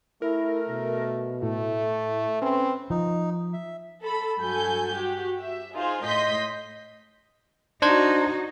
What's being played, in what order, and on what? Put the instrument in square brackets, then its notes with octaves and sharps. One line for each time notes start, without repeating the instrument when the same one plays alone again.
[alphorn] A3 [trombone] E4 [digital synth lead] A#4
[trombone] B2
[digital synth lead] A2 [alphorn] A3
[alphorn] C4 [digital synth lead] C#4 [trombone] B4
[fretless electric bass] F3 [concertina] D#4
[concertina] E5
[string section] A4 B5
G2 F#3 A4 G#5 G6
F#4 G4
E5
D#4 F4 G#4 C5
A2 D#5 C6 G6 B6
[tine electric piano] D4 C5 G#6 [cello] D#4 F#4